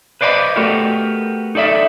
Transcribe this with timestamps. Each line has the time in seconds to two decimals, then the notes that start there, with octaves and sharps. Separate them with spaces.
0.21 B4 C5 D5 D#5 G5 B5
0.56 A3 B3 F#4 G4 A4 A#4
1.55 D#4 A4 D5 E5